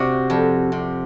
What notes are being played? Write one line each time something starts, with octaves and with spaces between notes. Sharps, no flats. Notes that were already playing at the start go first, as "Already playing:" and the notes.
Already playing: C3 F#4
F2
C3